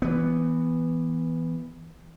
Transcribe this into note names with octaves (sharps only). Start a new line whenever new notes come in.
E3 B3